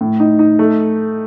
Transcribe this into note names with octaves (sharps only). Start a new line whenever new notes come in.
A2
D#4
D#4
A3